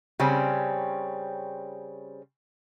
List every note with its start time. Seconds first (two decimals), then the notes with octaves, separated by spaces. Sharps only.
0.20 C#3 G3 C4 C#4